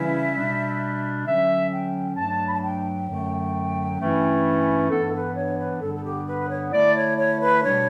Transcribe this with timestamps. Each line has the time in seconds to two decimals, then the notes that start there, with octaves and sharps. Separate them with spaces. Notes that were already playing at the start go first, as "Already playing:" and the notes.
Already playing: C#3 E3 G3 C#4 E4 E5
0.35 B2 G3 D4
1.26 D3 F#3 C#4 E5
1.71 G5
2.16 G2 F#3 A3 D4 A5
2.47 B5
2.54 A5
2.63 G5
3.08 F#2 D3 F#3 A3
3.99 G2 E3 A3 C#4 E4
4.89 G2 E3 B3 D4 A4
5.13 B4
5.35 C#5
5.58 B4
5.81 G2 D3 G3 B3 D4 A4
5.94 A4
6.04 G4
6.26 B4
6.49 C#5
6.72 D3 A3 E4 D5
6.94 C#5
7.17 C#5
7.40 B4
7.62 B2 G3 D4 C#5